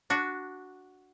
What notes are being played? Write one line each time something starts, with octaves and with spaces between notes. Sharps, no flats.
D4 F#4